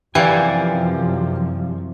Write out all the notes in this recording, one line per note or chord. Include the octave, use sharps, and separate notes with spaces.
F#2 C3 E3 F3 G4 D5 F5 G#5